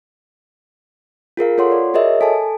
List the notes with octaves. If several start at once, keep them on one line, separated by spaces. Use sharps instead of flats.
F4 G#4 A#4 F5
F4 A4 C#5 F#5 C6
D5
F#4 G#4 A#4 C#5 D#5 E5
A4 G#5 A5